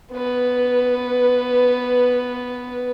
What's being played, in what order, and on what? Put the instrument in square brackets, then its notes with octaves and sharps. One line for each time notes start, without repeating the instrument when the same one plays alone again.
[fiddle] B3 B4